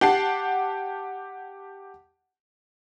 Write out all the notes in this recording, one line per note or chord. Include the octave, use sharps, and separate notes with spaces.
G4 F#5 A5 C7